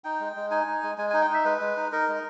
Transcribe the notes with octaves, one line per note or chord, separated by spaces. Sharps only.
D#4 G5
G#3
G#3
D#4 G#5
D#4
G#3
G#3 G#5
D#4 G#5
G5
D#4 E5
G#3 B4
G#3
D#4
D#4 A#4
G#3